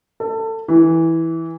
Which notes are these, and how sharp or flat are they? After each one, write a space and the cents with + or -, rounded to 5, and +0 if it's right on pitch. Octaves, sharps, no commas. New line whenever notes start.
A4 +25
E3 -10